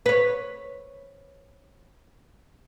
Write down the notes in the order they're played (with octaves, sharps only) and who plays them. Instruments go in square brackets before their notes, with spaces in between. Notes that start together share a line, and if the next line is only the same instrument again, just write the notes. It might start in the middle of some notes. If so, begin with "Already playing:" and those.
[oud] B4 C#5